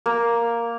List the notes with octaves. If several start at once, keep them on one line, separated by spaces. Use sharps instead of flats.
A#3